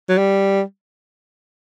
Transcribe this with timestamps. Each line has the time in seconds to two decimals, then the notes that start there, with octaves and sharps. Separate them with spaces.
0.09 F#3
0.18 G3